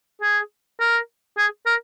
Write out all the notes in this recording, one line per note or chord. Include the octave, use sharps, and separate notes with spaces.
G#4
A#4
G#4
A#4